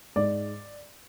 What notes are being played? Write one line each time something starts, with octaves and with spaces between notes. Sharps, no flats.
G#2 D5